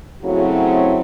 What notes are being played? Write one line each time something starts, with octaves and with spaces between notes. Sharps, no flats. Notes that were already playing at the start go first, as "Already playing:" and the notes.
C#3 F#3 A3 C4 E4 F#4